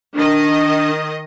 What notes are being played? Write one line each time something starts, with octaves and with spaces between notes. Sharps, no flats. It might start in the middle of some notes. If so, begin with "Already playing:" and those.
D#3 D4 D#5